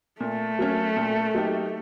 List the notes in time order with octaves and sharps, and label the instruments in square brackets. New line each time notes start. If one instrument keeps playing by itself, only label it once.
[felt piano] A#2 [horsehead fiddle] A3
[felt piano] F#3 A#3 C#4
A#2
F#3 A#3 D#4 G4